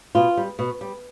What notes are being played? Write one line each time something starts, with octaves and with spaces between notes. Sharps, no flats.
B2 F4
G3
B2
G3